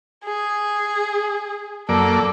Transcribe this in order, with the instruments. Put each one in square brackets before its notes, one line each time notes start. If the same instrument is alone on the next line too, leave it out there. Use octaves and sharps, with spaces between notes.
[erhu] G#4
[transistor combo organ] F#2 A#3 D5 [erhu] A4